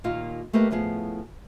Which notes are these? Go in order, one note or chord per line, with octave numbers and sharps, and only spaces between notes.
D#2 A#2 A#3 D#4 F4 F5
A3 A#3 G4 B4 D#5
A2 F3 B3 G#4